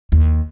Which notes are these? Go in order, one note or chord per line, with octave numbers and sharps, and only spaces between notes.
D#2